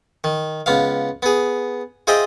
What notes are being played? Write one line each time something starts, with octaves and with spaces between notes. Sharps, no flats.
D#3
C#2 B3 F5
B3 G#4
F4 G#4 C5 D#5 E5 G5